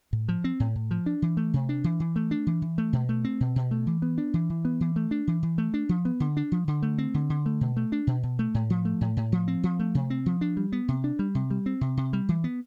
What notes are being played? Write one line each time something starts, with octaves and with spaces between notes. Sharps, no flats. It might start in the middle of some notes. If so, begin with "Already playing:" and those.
A2
F3
C4
A2
A2
F3
D4
E3
A3
C3
D4
E3
E3
A3
D4
E3
E3
A3
B2
A3
C4
B2
B2
A3
E3
B3
D4
E3
E3
B3
E3
A3
D4
E3
E3
A3
D4
F3
B3
D3
D4
F3
D3
A3
C4
D3
D3
A3
B2
A3
D4
B2
B2
A3
A2
F3
A3
A2
A2
F3
C4
F3
A3
C3
C4
F3
D4
G3
B3
C3
D4
G3
C3
G3
C4
C3
C3
G3
E3
B3